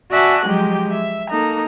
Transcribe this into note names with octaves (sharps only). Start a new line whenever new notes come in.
F#4 D5 E5 G#5 A5 F#6
F3 F#3 G#3 G4 G5
E5
A#3 D#4 A4 A#5